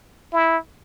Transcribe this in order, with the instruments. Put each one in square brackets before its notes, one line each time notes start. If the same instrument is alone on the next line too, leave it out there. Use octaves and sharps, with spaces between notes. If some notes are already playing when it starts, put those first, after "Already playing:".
[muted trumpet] E4